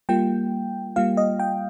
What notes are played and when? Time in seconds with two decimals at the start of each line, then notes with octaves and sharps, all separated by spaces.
0.09 G3 A#3 F4 G5
0.96 G3 A#3 F4 F5
1.17 D#5
1.39 G5